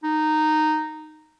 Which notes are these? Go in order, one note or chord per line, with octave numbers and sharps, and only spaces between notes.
D#4